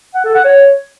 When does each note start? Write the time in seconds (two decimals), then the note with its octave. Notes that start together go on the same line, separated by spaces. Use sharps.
0.14 F#5
0.24 A4
0.34 F#5
0.44 C#5